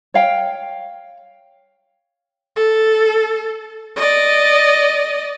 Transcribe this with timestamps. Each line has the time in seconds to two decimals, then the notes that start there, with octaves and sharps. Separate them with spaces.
0.14 C#5 F5 G5
2.56 A4
3.96 D5 D#5